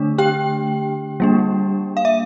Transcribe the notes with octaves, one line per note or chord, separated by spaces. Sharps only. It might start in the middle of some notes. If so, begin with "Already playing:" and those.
Already playing: D3 A3 D4
G4 G5
G3 A#3 D4
F5
E5